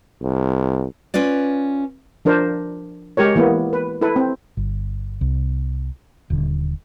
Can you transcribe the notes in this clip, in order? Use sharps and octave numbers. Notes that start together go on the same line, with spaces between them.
C2
C#4 F4 B4 D5
F3 D4 A#4 C5
G#3 G4 A#4 C#5
E3 A#3 B3
B4
E4 A4 B4
C4
G1
C2
D#1 D3